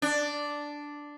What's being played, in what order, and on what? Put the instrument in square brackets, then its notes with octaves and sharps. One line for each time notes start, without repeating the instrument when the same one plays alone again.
[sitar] D4